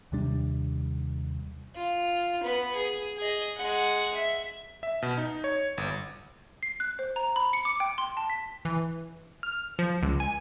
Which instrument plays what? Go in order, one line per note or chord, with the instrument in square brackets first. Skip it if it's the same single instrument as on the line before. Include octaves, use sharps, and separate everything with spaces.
[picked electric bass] D#2 C3 G3 D4
[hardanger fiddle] F4
B3 B4
G#4
G#4 D#5
G#3 F#5
E5
[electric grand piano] E5
B2
D#4
C#5
G1
[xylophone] C7
F#6
C5
A#5
B5
C#7
D6
G5
C6
A5
B6
[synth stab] E3
F6
F3
C#2
G#5